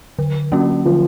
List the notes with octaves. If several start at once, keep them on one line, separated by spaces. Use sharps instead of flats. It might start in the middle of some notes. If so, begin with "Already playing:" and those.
D3
F#3 A#3 C#4 F#4
D3 F3